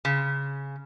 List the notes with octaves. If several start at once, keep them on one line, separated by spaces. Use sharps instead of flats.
C#3